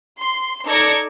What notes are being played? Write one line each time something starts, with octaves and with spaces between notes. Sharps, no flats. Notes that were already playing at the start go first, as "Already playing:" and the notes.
C6
D#4 A4 D5 G#6 A#6 C#7